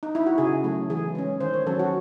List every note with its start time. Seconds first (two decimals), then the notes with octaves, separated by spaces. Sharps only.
0.03 D#4
0.15 E4
0.26 F#4
0.38 C#3 G#4
0.64 F#3 A3
0.90 E3 G#4
1.15 G#3 C#4
1.40 D#3 C5
1.54 C#5
1.67 F#3 C#4 A4
1.79 F#4